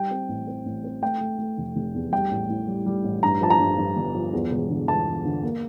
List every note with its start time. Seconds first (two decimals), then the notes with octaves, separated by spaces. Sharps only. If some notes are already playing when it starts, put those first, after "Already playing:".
Already playing: G3 G5
0.11 C4
0.29 A1
0.47 C4
0.66 A1
0.84 C4
1.02 A3 G5
1.21 A3
1.39 A3
1.58 F1
1.76 F1
1.94 E2
2.12 G3 G5
2.31 A1
2.49 A2
2.68 G3
2.86 G3
3.04 A1
3.23 G2 A#5
3.41 F3 A5
3.50 A#5
3.59 G2
3.78 G2
3.96 G1
4.15 F3
4.33 E2
4.51 E1
4.70 D3
4.88 E1 A5
5.07 E1
5.25 D3
5.43 A#3